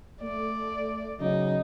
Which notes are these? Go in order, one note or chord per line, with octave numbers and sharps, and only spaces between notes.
A3 D5
C#3 F#3 D#4